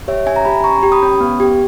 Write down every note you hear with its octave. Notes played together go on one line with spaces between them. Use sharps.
G4 C#5 E5
C#4 E5 G#5
A#5
G4 G#5 B5
C#4 A#5 C#6
G4
B5 D#6
C#4
B3
G4